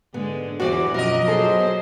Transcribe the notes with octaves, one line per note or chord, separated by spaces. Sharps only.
G#2 D3 G#3 B3
E2 E3 G3 C4 F#4 D5
F#2 B2 F3 F#3 A#4 D#5
F#3 B3 G#4 A4 C5